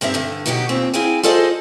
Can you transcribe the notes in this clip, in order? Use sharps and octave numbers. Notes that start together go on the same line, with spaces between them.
G2 C4 D#4 G4 E5
G2 D3
B2 F#3 B3 D#4 F#4 G4
D#2 A#2 C4
C4 E4 G#4 F5 G5 G#5
F4 G#4 A4 C5 D5 D#5